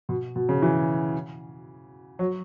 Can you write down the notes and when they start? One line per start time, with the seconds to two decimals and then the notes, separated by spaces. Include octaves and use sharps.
0.09 B2
0.36 B2
0.49 C#3
0.62 E3
2.19 F#3